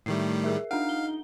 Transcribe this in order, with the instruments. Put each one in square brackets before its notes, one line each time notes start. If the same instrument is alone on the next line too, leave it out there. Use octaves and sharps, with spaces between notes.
[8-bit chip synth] A2 D#3 G3 [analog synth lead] A3 [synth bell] C7
[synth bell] G#4 A#4 E5
[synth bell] D4 F#5 [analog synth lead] D#4 [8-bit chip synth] F5
[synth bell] G7